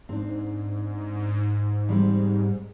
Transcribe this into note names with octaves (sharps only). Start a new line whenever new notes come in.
G#2 C4 D4
G3 G#3 C4